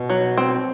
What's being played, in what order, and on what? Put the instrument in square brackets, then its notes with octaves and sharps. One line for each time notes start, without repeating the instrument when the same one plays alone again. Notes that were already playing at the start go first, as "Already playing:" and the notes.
Already playing: [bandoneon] B2
[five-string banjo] F#3
C4